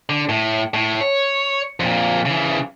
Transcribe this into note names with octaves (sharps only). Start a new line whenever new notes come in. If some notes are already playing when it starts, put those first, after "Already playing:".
D3
A2
A2
C#5
F2 A#2
C#3 E3